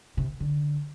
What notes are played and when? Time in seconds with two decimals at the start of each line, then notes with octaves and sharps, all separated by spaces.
0.17 C3
0.40 D3